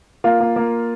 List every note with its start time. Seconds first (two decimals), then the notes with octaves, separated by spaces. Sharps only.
0.24 A#3 F4
0.40 A#3
0.56 A#3